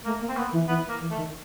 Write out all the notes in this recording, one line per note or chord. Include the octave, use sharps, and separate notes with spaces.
A3 A#3
A#3
C4
A#3 B3
E3
E3 B3
A#3
E3
A3
D#3